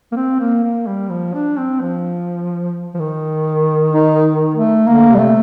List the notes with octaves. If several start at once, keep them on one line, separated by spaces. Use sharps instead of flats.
A#3
C4
A#3
A#3
G3
F3
D4
C4
F3
F3
D#3
D#4
A3
D3 A#3
C3 G3
A3